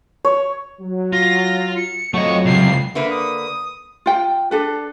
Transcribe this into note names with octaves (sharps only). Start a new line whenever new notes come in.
C#5
F#3
F4 A#6
C#7
F2 F#3 A3 D#5 C#6
C#2 C3 C7
D3 A#3 B4 E5
D#6
F4 G5
D4 A4 B4